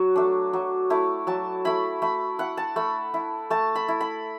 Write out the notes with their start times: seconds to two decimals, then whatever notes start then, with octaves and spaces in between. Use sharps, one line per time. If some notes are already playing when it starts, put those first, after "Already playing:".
Already playing: F#3 F#4
0.16 A3 D4
0.53 F#3
0.90 A3 E4
1.27 F#3 A5
1.65 A3 E4 B5
2.02 A3 B5
2.39 E4 F#5
2.57 A5
2.76 A3 B5
3.14 E4
3.50 A3 A5
3.76 B5
3.88 E4
4.01 B5